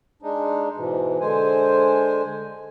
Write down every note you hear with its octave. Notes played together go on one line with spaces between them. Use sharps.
G#3 D4 D#4
G#2 B2 E3
D3 G#3 C5 G#5